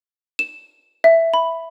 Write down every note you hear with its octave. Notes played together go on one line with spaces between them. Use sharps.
E7
E5
B5